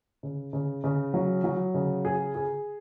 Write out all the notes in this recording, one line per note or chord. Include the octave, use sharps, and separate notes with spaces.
C#3
C#3
C#3
F#3
F#3
C#3
G#4
G#4